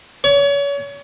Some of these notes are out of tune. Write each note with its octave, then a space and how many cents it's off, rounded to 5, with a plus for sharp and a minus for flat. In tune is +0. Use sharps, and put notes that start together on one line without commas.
C#5 +35